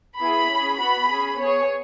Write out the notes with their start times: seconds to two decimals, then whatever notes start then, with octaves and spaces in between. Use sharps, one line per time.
0.19 B3 E4 G#4 B5
0.49 C#4 G#4
0.79 B3 F#4 B5
1.09 C#4 G#4
1.38 B3 G#4 C#5